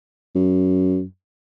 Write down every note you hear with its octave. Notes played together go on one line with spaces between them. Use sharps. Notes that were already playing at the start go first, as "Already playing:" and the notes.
F#2